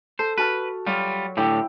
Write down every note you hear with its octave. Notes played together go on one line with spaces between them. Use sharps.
A4 C5
F#4 B4 A5 F6
F#3 G3 F4
A2 D3 E4 G4 G5